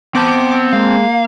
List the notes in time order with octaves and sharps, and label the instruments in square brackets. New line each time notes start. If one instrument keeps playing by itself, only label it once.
[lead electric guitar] B3 [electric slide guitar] C4 C5 A5 [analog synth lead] D6
[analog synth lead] G#3 [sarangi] A#3 [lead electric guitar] F5